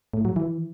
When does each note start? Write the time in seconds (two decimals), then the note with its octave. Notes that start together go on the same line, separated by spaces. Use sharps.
0.14 A2
0.25 F#3
0.36 E3